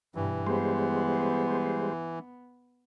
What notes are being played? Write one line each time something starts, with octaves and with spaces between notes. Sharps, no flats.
G2 B2 E3
G3 G#3 B3 C5